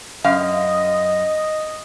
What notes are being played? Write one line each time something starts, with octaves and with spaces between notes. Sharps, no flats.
F#2 D#5 F5